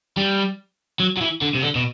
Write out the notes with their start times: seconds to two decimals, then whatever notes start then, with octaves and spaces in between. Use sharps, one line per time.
0.17 G3
1.00 F#3
1.17 F#3
1.21 E3
1.41 D3
1.54 C3
1.62 D3
1.75 B2